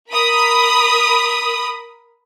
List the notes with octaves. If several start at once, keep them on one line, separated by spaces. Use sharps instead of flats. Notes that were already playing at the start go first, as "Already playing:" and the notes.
A#4 B5 D#6